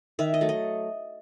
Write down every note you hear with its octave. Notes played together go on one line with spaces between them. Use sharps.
D#3 E5
D#5
F#3 A3
D#5